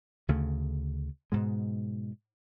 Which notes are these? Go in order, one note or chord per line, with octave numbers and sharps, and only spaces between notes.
D2 C#3 A3
G#2 B2 G#3